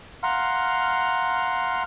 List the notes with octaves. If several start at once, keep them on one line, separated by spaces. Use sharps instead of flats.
F5 F#5 A#5 C6 F6